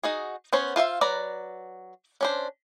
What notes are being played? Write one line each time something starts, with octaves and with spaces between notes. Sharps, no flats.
D#4 F#4 G#4
B3 C#4 C5 C#5
F4 C5 E5 F5
F#3 B4 D5 A#5
C#4 D4 C5